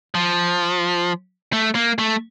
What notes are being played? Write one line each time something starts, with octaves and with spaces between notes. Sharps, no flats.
F3
A3
A#3
A3